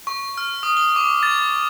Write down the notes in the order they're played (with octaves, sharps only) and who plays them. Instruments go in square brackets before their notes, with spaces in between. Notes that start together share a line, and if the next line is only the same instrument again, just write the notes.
[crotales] C#6
F6
D#6
G7
D6
A6